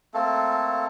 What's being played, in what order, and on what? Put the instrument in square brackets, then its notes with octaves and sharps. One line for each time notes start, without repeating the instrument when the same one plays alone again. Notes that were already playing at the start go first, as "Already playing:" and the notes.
[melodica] A3 A#3 C4 A4